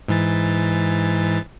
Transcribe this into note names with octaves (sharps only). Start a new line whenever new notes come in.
G#2 E3 A6